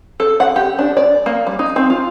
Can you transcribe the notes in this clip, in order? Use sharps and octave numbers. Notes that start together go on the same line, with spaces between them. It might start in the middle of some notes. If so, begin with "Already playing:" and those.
A4
F#5
G4
D4
D5
A#3
G3
D#4
C4
F4